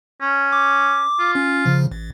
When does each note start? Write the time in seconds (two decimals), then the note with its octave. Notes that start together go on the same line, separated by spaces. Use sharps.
0.22 C#4
0.52 D6
1.20 F4
1.35 C#4
1.66 C#3 F3
1.92 A1